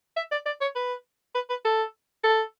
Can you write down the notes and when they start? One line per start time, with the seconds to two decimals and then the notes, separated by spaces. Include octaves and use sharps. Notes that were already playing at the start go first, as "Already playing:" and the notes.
0.16 E5
0.32 D5
0.46 D5
0.61 C#5
0.76 B4
1.35 B4
1.49 B4
1.65 A4
2.24 A4